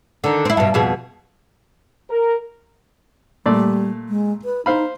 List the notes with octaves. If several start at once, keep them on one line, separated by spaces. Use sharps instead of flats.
D3 D#3
C4 E4
G2 B2
F2 B2 G#4
A#4
A#2 G3 A3 D5
G#3
B4
D#4 C5 F5 B5